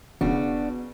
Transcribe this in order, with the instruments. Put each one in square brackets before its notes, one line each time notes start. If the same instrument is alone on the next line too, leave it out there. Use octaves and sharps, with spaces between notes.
[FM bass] E1 [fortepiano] C#3 [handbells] B3 [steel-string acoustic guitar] D4 F#4